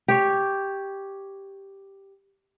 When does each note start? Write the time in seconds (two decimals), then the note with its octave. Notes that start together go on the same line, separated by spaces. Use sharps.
0.08 G4 C#5